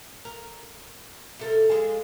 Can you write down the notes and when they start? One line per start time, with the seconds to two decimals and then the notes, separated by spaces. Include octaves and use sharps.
0.25 A#4
1.39 C3 A4 A#4
1.69 F2 G#3